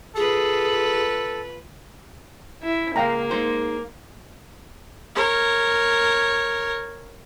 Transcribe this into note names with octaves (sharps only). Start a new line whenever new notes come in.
F4 G#4 A4 B4
E4
C#2 G#3 A#3 F5 G5 A#5
G#3 D#4 C5
A#4 C#5